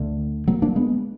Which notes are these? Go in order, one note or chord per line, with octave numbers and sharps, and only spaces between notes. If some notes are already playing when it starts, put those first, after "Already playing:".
Already playing: D2 D3
F#3 A#3
A#3 D4
G#3 B3